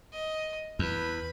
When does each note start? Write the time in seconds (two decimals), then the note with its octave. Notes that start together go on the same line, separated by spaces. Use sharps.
0.13 D#5
0.79 E2 B4 B5